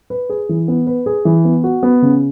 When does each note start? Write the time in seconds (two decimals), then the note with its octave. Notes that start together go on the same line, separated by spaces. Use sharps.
0.10 B4
0.30 G#4
0.49 E3
0.68 B3
0.87 B4
1.06 G#4
1.25 E3
1.45 B3
1.64 F#4
1.83 B3
2.02 C#3